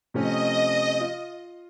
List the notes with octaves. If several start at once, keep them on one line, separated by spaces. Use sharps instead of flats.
C3 F3 A3 C#4 D#5
F4